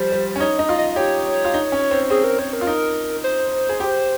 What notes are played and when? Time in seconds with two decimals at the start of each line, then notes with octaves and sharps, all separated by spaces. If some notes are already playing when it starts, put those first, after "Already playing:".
Already playing: F3 G3 C5
0.12 G3
0.36 C#4
0.40 D#4 C#5
0.59 D#4 D#5
0.69 F4
0.78 D#5
0.96 G4 C#5
1.45 F4
1.54 D#4
1.72 C#4
1.91 C4
2.10 C4 G#4
2.24 A#4
2.38 C4 C#5
2.53 A#4
2.61 F4
2.67 D#4
3.24 C5
3.69 G#4
3.80 G4